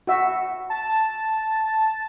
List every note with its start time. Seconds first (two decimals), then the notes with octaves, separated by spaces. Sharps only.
0.07 F#4 E5
0.70 A5